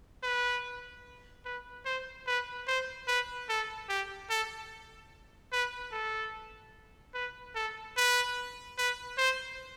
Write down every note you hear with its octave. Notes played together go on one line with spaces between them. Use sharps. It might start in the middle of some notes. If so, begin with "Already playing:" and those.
B4
B4
C5
B4
C5
B4
A4
G4
A4
B4
A4
B4
A4
B4
B4
C5